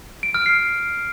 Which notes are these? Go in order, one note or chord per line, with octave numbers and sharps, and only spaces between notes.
D7
F6
C7